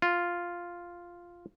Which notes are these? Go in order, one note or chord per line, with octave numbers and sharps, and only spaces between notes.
F4